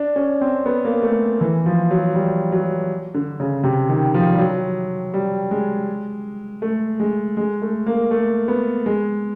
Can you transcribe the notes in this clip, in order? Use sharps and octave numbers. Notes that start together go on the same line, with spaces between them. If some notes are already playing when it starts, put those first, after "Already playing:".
Already playing: D4
C#4
C4
B3
A#3
A3
E3
F3
F#3
G3
F#3
D3
C#3
C3
D#3
F3
G3
F#3
G3
G#3
A3
G#3
G#3
A3
A#3
A3
B3
G#3